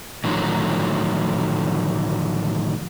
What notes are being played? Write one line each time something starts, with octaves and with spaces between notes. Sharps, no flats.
A2 D3 D#3 F3 F#3